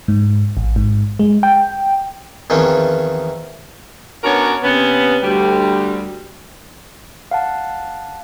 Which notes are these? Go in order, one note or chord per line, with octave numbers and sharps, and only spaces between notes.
G#2
A1
G#2
G#3
G5
E2 D#3 F3 C4 C#4
B3 C#4 D4 F#4 A#4 C#5
C3 B3 C#4
D2 G3
F5 F#5 A5